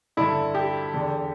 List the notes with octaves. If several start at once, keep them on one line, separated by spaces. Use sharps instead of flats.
G2 D3 E4
G4
E2 D3